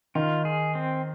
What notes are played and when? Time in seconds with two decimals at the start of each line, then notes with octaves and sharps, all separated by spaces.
0.15 D#3 F4
0.45 G#4
0.75 C4